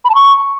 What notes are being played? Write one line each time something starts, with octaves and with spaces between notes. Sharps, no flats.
B5
A5
C#6